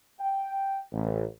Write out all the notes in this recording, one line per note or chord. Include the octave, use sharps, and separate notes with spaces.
G5
A1